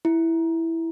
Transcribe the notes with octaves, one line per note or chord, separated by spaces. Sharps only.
E4